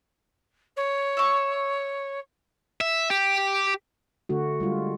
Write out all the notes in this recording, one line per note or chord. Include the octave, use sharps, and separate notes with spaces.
C#5
E5 C#6
E5
G4
D3 A3 F#4
G3 G#3 F4